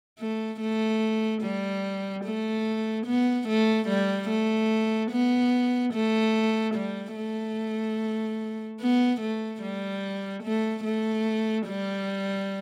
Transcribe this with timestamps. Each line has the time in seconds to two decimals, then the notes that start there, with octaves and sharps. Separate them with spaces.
0.20 A3
0.61 A3
1.43 G3
2.25 A3
3.07 B3
3.48 A3
3.88 G3
4.30 A3
5.12 B3
5.94 A3
6.75 G3
7.16 A3
8.81 B3
9.21 A3
9.62 G3
10.44 A3
10.84 A3
11.67 G3